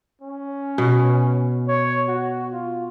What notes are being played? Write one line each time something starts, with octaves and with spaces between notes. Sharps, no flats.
C#4
B2
C#5
F#4
F4